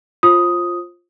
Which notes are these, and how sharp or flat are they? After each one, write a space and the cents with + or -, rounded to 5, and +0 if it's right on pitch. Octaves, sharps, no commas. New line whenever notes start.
F4 +0 C5 +30 D#6 +0